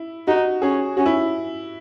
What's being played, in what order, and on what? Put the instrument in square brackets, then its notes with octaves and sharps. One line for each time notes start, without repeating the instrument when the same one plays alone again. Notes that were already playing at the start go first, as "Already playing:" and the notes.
Already playing: [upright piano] E4
[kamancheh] D#4 [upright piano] F#4
[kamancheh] C#4 [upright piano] G#4
[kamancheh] C#4 [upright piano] F#4
[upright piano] E4